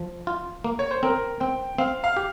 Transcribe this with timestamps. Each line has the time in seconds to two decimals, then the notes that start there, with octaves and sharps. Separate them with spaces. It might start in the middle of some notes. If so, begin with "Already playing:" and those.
Already playing: F3
0.27 F4
0.64 A#3
0.79 C#5
0.91 C5
1.03 C4 A#4
1.40 C4 G5
1.78 C4 F5
2.04 F5
2.16 G4